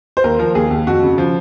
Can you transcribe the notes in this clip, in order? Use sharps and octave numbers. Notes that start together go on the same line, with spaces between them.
C5
D#2 A#4
F3 A#4
D#2 G#4
D#2
F2 F#4
C#3
F3